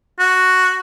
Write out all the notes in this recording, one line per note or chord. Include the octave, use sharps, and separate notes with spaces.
F#4